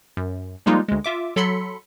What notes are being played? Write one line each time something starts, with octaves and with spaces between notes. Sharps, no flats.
F#2
F3 G3 G#3 A#3 D#4 F4
D2 G#3
F4 E5 D6
F#3 A4 B5 C6 B6 C#7